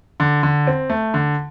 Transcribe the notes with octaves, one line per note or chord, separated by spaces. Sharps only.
D3
D3
C4
A3
D3